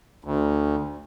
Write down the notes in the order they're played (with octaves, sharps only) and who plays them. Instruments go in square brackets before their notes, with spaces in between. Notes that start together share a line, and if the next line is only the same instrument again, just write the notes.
[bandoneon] D2